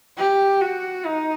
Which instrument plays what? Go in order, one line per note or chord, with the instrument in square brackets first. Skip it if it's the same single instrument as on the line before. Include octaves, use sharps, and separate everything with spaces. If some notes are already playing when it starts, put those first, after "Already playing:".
[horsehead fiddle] G4
F#4
D#4